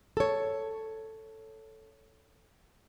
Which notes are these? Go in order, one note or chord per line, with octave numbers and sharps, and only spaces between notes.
A4 C#5